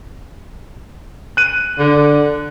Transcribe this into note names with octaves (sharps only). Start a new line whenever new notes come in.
F#6 D#7
D3